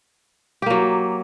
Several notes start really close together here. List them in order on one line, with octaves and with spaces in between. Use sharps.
G4 A#3 F#3